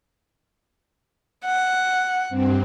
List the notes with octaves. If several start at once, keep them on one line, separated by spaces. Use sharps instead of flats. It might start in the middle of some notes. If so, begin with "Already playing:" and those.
F#5
G2 C4